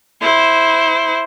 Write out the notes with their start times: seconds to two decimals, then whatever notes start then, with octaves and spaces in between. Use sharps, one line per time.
0.22 E4 C5